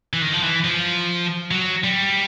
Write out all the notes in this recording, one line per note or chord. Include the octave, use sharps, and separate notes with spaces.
E3
D#3
F3
E3
F3
F#3
G3